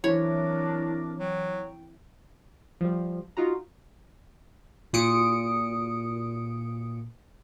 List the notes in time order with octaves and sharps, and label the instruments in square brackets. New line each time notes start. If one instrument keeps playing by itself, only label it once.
[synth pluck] E3 C4 E4 [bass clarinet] F#3 [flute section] D4 A#4 D6 [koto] C#5
[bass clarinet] F#3 [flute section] G5
[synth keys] F3 G3
D#4 F4 F#4 A#5
A#2 D#6 C#7 D7